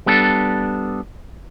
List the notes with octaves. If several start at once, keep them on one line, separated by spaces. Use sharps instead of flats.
G3 B3 D4 A4